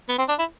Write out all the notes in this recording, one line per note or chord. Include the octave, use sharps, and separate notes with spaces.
B3
C4
D4
E4